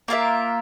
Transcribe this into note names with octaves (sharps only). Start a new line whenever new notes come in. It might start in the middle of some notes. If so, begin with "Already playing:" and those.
A#3 F4 A#4 E5